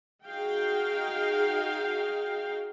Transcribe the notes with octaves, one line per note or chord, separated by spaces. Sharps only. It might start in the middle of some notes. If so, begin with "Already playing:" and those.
D#4 F#4 G#4 F5 G5